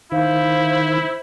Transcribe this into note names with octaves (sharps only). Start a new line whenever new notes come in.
D#3 E4 C5 F5